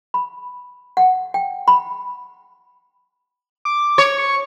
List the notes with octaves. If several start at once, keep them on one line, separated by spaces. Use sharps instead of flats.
B5
F#5
G5
B5
D6
C#5
C#6